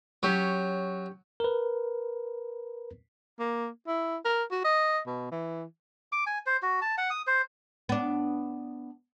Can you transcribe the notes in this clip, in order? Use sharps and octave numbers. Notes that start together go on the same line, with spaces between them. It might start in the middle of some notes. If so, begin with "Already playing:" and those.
F#3 C#4 G4 C#5
A#4 B4
A#3
E4
A#4
F#4
D#5
B2
E3
D6
G#5
C5
F#4
A5
F#5
D#6
C5
B3 D4